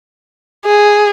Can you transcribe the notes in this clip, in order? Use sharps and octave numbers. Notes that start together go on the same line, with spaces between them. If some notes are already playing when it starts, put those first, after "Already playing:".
G#4